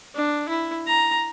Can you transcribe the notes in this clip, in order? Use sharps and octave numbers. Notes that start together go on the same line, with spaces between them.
D4
E4
A#5